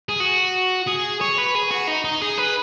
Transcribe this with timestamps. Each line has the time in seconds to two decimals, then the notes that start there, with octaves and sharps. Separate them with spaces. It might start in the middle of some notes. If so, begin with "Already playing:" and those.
0.09 G#4
0.20 F#4
0.88 G#4
1.21 C#5
1.38 B4
1.55 G#4
1.71 F#4
1.88 D#4
2.05 D#4
2.22 G#4
2.38 B4